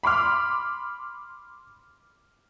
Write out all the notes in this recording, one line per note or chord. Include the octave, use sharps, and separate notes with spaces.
B5 C6 D6 F6